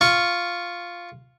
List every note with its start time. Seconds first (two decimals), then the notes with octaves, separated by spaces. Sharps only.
0.01 F4 C#6